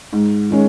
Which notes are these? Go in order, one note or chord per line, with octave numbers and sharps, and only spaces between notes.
G#2
D#3 G#3 C#4